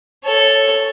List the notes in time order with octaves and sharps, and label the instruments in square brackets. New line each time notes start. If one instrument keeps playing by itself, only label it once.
[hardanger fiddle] A4 C#5